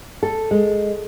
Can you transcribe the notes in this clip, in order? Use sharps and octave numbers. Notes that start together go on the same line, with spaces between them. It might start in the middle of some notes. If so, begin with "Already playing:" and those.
A4
G#3